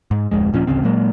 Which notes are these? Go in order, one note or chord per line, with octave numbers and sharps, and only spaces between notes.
G#2
D1 F2 G#3
D#1 A#2 F3 C#4
A1 D2 C#3 C4
A#2 F#3 G#3 A#3